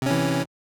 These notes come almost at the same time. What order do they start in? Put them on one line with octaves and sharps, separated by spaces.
C3 C#4 E3